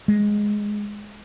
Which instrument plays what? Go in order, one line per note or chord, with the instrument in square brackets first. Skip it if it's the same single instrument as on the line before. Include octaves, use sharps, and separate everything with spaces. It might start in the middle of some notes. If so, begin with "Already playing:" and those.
[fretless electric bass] G#3